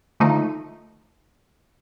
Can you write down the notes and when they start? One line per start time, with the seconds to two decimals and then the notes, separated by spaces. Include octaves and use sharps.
0.20 D3 D#3 F3 A3 D#4